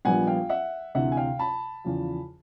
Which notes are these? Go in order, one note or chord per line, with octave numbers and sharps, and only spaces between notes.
A#1 A#2 G3 B3 F#5 G#5
F5 G5
E5 F#5
D2 C3 E3 E5 F#5
G#5
F5 G5
A5 B5
E2 C#3 F3